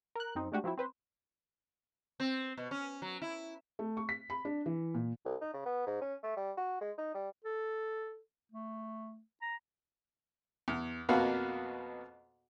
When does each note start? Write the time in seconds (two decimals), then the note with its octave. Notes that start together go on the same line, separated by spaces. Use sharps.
0.15 A#4 F#6
0.35 F#2 C4 D#4
0.52 G#3 A3 D4 F#4 G4
0.64 F3 F#3 C4 E4
0.78 C4 B4 C5
2.20 C4
2.57 B2
2.71 C#4
3.02 F#3
3.22 E4
3.79 A3
3.97 C#6
4.09 B6
4.30 B5
4.45 D4
4.66 E3
4.94 A#2
5.25 C2
5.42 D#4
5.54 C#3
5.66 B3
5.87 G#2
6.02 C#4
6.23 A3
6.37 G3
6.58 F#4
6.81 G#3
6.98 D#4
7.15 G3
7.44 A4
8.52 A3
9.42 A#5
10.68 E2
11.09 F2 B2 A#3 B3 F#4 F5